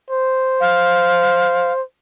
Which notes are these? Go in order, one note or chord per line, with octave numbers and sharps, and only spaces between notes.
C5
F5